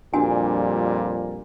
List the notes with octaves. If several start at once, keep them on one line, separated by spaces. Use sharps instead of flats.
F2 A#2 G3 D4 F#4 G#5